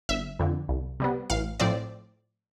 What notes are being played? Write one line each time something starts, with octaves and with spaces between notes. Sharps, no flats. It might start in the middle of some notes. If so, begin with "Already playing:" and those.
G1 E5
F2 D3
C2
C3 G3 B3
A1 F5
A2 F3 C4 D5